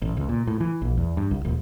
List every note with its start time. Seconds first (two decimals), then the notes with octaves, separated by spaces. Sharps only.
0.02 A1
0.17 C#2
0.29 A#2
0.47 A2
0.60 E3
0.82 A#1
0.97 E2
1.17 G2
1.31 C2
1.45 D#1